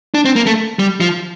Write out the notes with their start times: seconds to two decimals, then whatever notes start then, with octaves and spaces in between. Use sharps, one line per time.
0.14 D4
0.25 C4
0.36 A#3
0.47 A3
0.79 G3
1.00 F3